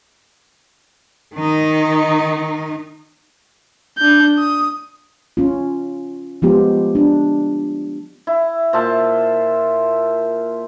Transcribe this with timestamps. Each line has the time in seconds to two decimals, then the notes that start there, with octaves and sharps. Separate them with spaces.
1.36 D#3 D#4
3.98 D4 G6
4.38 D#6
5.37 C#4 F4
6.42 F3 G#3 B3 F4 G4
6.95 D4
8.27 E4
8.73 A#2 C5 E5 A5